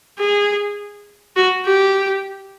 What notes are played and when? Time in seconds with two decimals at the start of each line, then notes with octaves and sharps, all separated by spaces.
0.19 G#4
1.36 F#4
1.65 G4